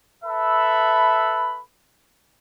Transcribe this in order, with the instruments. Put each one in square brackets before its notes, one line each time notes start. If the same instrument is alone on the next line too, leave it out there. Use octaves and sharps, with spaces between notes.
[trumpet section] A4 B4 E5 B5